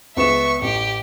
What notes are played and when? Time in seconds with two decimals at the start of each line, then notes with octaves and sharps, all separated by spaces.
0.17 C#2 B3 E5 C#6 E7
0.62 A1 G4